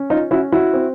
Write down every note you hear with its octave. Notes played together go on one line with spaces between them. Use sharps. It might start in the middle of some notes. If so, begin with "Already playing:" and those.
Already playing: C#4
D#4 F4
C#4 E4 F#4
E4 F#4
C4